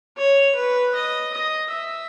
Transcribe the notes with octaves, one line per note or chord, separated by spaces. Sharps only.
C#5
B4
D#5
D#5
E5